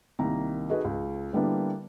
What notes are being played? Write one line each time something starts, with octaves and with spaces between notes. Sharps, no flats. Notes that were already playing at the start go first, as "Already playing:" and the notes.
C2 D#3 A#3 A#5
D#4 F#4 G#4 A4 B4 D#5
C#2
D3 G3 A#3 B3 D4 E4